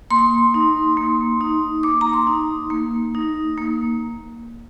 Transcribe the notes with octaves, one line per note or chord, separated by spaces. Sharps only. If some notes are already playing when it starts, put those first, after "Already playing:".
A#3 C6
D#4
A#3
D#4
A#3 D6
A#5
C6
D#4
A#3
D#4
A#3